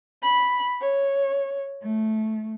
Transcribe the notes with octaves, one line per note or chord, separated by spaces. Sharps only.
B5
C#5
A3